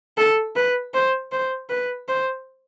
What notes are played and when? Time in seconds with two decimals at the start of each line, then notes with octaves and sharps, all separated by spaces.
0.18 A4
0.56 B4
0.94 C5
1.32 C5
1.69 B4
2.08 C5